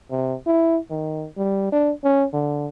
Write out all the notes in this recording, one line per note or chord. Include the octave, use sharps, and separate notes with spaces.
C3
E4
D#3
G3
D4
C#4
D3